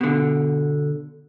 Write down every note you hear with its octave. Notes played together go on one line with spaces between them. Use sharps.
B2 D3